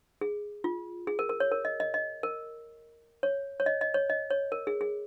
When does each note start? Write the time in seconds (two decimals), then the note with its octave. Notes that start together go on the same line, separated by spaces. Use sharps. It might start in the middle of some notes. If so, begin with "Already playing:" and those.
0.21 G#4
0.64 F4
1.07 G#4
1.19 A#4
1.29 A#4
1.40 C#5
1.52 A#4
1.65 D#5
1.80 D#5
1.94 D#5
2.23 A#4
3.23 C#5
3.60 C#5
3.66 D#5
3.81 D#5
3.94 C#5
4.10 D#5
4.30 C#5
4.52 A#4
4.67 G#4
4.81 G#4